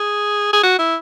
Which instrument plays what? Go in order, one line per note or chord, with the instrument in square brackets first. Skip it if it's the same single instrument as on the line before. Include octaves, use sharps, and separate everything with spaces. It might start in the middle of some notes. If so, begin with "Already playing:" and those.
Already playing: [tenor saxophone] G#4
G#4
F#4
E4